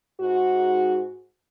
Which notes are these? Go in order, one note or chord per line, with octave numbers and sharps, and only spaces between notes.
G#2 F#4